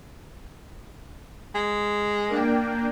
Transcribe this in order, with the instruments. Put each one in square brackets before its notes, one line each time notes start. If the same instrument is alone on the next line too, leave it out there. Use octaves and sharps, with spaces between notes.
[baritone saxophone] G#3
[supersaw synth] A#3 D4 G5